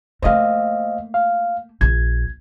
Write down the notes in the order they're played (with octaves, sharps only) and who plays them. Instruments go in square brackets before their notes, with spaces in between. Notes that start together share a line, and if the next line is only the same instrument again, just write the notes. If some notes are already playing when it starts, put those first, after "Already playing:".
[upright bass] A3 A#3 [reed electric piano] C5 D#5 F5
[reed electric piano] F5
[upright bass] A#1 [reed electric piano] G#6